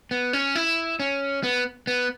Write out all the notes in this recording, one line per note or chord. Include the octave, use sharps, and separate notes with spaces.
B3
C#4
E4
C#4
B3
B3